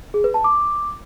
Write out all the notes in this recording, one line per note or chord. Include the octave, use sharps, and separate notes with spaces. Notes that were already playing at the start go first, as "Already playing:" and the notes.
G#4
B4
A5
D6